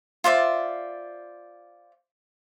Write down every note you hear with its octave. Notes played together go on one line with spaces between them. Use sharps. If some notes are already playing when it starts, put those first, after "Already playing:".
F4 C5 D5 E5